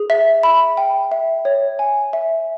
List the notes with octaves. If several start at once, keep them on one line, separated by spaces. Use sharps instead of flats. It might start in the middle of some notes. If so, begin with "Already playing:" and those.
Already playing: G#4
E5
B5
G5
E5
C#5
G#5
E5